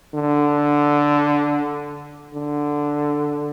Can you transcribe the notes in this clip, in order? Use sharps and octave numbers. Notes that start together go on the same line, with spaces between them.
D3
D3